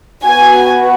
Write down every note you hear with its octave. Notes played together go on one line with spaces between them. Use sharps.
B3 F#4 G#5